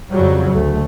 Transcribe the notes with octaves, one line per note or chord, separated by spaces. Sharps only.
F2 C#3 F#3 G3
D2 A3